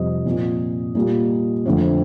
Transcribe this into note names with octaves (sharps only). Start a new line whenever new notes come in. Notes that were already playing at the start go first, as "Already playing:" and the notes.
Already playing: F2 C3 G3 D#5
A#2 F3 C4
A#2 G3 A#3
F2 D3 A3 C4